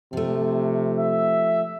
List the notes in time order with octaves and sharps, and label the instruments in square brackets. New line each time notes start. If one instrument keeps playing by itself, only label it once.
[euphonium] C3 [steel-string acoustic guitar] F3 A3
[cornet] E5